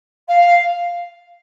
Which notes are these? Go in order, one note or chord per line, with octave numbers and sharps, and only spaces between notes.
F5